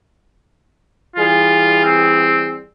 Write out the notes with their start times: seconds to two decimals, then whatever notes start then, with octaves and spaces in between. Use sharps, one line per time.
1.16 E3 G3 F4 G#4
1.85 C4